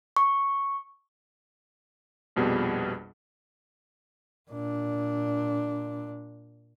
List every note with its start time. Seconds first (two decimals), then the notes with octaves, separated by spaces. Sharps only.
0.17 C#6
2.36 A#1 F2 B2 G3 G#4
4.50 A#2 D4